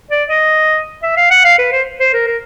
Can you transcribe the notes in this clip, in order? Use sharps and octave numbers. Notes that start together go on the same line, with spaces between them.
D5
D#5
E5
F5
F#5
F5
B4
C5
C5
A#4
A#4